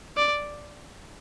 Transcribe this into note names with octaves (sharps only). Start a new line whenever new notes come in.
D5